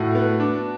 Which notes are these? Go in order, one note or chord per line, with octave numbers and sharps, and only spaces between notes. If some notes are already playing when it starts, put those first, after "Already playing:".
Already playing: A2 F#4
B3
D4